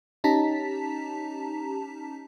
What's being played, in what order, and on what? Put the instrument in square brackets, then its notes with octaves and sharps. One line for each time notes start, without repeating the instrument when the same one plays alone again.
[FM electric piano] C#4 D#4 G4 A5 A#5 B6